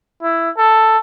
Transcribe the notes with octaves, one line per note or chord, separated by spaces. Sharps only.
E4
A4